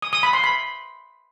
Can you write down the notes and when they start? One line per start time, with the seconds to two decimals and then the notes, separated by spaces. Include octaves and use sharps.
0.02 D#6
0.13 D#6
0.23 B5
0.33 C6
0.44 B5